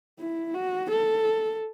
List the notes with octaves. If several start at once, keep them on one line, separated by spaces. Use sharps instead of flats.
E4
F#4
A4